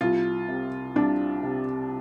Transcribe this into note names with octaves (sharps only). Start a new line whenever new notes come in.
C2 F4
C3
C2 D4
C3